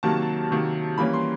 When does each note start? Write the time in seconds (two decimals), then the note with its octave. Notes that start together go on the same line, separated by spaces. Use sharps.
0.03 C3 D#3 F#3 A#3 A5
0.51 C3 D#3 F#3 A#3
0.98 E3 G3 A#3 C#4 B5
1.13 C6